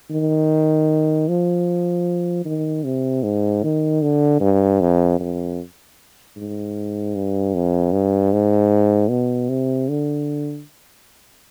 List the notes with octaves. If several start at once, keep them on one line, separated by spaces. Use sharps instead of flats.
D#3
F3
D#3
C3
G#2
D#3
D3
G2
F2
F2
G#2
G2
F2
G2
G#2
B2
C3
D3